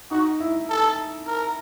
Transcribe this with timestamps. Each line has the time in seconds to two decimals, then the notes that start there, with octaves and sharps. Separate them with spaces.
0.11 D#4 F#4
0.40 E4
0.69 A4
1.27 A#4